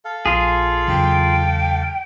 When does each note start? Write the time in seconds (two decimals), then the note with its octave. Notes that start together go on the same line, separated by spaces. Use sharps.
0.05 A4 F5
0.26 A#1 F4 G#4
0.88 E2 C#3 F#3 G5